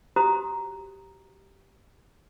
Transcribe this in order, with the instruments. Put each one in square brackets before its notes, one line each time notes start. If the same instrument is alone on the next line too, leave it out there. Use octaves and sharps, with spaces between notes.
[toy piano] F#4 G4 C5 A#5 D#6